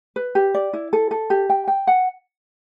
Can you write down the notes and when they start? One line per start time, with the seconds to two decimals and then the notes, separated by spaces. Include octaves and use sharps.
0.16 B4
0.35 G4
0.54 D5
0.73 E4
0.93 A4
1.11 A4
1.30 G4
1.50 G5
1.68 G5
1.87 F#5